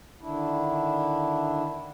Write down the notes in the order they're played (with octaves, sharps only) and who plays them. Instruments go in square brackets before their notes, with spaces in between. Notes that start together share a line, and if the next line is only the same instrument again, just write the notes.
[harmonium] D3 D#3 D4 E4